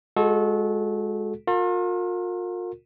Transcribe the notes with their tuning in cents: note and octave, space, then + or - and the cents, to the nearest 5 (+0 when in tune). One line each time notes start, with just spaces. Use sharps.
G#3 +0 F#4 -30 A4 -25
F4 +40 A#4 -35